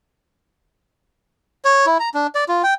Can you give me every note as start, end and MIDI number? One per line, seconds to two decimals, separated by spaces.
1.65 1.86 73
1.86 1.98 64
2.00 2.09 82
2.14 2.27 62
2.35 2.44 74
2.49 2.62 65
2.64 2.74 79